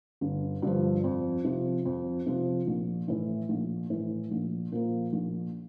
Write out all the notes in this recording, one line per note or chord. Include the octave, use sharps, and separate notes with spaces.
G1
G2 D3 F3
F2
C3 F3
F2
C3 F3
A#1
A2 E3
A#1
A2 E3
A#1
A#2 F3 A#3
A#1